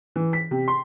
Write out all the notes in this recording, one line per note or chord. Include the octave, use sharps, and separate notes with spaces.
E3
B6
C3
C6